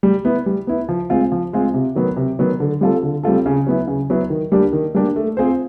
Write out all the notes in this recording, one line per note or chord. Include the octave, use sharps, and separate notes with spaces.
G3
B3 E4
G3
B3 E4
F3
G#3 C4 F4
F3
G#3 C4 F4
C3
D#3 F#3 B3
C3
D#3 F#3 B3
D3
G3 C4 F4 A4
D3
G3 C4 F4 A4
C#3
F#3 B3 E4
C#3
F#3 B3 E4
D#3
G3 A#3 D4 G4
D#3
G3 A#3 D4 G4
A3
C4 F4 G#4 C5